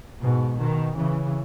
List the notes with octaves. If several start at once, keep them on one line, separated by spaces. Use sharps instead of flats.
G#2 B2
B2 D#3
C#3 E3